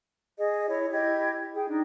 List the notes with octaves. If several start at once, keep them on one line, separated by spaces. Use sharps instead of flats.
G#4 D#5
E4 C#5
E4 G4 D#5 G#6
G#4 G5
D4 D#4